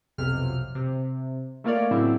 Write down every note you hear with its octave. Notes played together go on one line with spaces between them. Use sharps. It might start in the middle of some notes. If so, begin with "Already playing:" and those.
B1 F2 C3 F6
C3
A3 A#3 F4 A#4 C#5 D5
A2 C#3 F#3 C4 E4